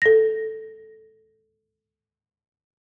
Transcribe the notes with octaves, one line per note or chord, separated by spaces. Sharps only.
A4 A#6